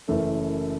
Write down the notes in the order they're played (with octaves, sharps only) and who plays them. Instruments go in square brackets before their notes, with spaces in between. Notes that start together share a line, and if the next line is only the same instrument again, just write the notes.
[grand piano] F#1 F#2 E3 A3 C#4